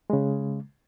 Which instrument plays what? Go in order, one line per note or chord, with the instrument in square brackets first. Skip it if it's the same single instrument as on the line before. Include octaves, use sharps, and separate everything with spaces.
[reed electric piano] C#3 G#3